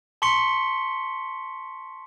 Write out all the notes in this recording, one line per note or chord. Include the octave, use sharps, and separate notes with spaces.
A5 C6 C#6 B6 C#7 G7